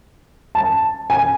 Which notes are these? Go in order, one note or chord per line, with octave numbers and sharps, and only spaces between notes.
A5
G#5